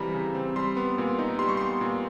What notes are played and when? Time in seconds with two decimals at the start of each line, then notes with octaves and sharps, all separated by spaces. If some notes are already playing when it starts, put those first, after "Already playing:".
Already playing: C#3 E3 G3 C4 A#5 B5
0.14 C#3
0.35 C4
0.56 G3 C6
0.77 B3
0.98 A#2
1.19 D#4
1.39 G3 C6
1.48 C#6
1.57 B3 C6
1.81 A#2